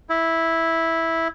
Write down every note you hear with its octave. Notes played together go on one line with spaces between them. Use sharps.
E4